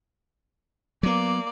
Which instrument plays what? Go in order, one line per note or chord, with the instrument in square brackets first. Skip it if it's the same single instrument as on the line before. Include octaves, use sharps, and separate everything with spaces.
[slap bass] F#3 B3 [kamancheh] A#3 D5